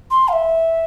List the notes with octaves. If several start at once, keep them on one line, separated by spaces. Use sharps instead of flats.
C6
F5
E5